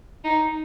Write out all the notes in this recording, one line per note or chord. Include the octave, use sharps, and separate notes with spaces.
D#4